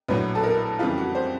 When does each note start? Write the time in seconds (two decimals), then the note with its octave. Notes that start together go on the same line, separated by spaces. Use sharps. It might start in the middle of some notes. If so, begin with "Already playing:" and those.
0.08 A#1 A2 F#3 B4
0.35 A4
0.44 A#4
0.79 F2 C#3 E3 G3 F4
0.98 F#4
1.15 C5